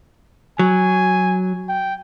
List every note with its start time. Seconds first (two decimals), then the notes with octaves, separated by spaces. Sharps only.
0.59 F#3 G#5
1.69 G5